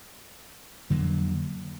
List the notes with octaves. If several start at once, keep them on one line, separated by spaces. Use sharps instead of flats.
F2 D3 F#3 A#3